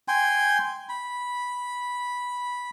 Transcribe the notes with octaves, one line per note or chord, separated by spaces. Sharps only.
G5 G#5 C6
B5